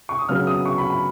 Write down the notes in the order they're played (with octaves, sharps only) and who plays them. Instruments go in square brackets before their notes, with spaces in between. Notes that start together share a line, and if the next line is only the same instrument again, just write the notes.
[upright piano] C#6
D#6
C#3 F#3 B3 F6
D#6
C#6
B5
B5